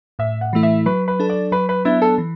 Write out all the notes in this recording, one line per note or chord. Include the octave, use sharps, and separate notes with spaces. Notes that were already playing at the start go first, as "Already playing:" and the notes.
A2 E5
F#5
E3 A3 E4
E5
F#3 B4
B4
D4 A4
D5
F#3 B4
B4
B3 D4 E4
A4
E3